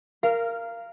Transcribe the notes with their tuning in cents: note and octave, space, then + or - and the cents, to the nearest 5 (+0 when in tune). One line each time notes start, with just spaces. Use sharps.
A#4 -5 F5 -20